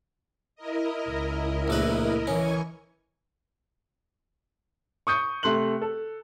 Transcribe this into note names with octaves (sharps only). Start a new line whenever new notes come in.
E4 A#4 D#5
C#2
A#1 A3 B4
E3 C#4 G#5 C#6
C#6 D#6 G6 C#7
C3 A3 C6 F#6 F#7
A4